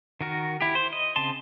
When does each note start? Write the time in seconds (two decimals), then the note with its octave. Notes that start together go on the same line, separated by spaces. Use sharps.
0.21 D#3 F#4 A#4
0.61 E4 G4
0.75 C5
0.93 D#5
1.16 C#3 C4 A5 C6